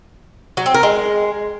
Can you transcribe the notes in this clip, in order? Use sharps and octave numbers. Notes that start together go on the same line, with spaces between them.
F#3
C4
A#4
G#3